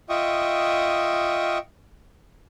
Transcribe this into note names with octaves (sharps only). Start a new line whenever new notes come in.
F4 D#5 E5 G5 C#6 D#6